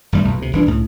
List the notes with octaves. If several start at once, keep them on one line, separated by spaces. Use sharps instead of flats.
G#1 G2 G3 A3
B1 F#2
D2 C3
G1 E3 D4
C#2 A2